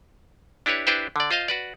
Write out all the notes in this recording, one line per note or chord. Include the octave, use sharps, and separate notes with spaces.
D4 E4 G4 B4 C#5
D4 E4 G4 B4 C5 G5
D3 D5
F4 C5 D#5 F5
F#4 B4 D5